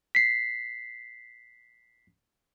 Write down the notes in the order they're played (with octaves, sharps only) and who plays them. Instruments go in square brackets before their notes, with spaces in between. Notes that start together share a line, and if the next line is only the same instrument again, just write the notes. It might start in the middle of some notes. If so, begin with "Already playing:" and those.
[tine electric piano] B6 C7